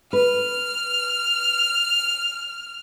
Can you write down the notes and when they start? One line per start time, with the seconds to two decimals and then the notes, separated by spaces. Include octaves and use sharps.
0.13 B4 F6